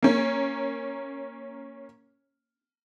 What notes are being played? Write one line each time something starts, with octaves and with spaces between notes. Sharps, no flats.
A#3 C#4